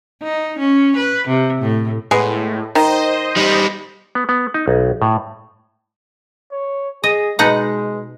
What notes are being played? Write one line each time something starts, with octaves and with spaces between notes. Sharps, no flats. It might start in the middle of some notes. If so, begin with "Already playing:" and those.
D#4
C#4
B4
C3
A2
A2 G#3 B3
D#3 C5 D#5
G3 D#4
B3
B3
D#4
B1
A2
C#5
G#4 D#5
B2 G#3 D#4 F#5